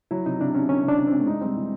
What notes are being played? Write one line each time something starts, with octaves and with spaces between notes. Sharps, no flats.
F#3 E4
C3 D#4
C3 D4
C3 C#4
D#3 C#4
C3 D4
C3
C4
C3
A3
G#3 D#4
G3 C4
E3